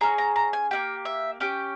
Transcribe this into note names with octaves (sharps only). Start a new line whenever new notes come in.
C#4 G#4 A#5
A#5
A#5
G#5
A#3 C#4 G4 G5
E5
C#4 G4 G5